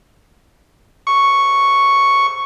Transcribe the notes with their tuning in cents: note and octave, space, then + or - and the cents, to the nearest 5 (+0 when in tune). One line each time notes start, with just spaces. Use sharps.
C#6 +0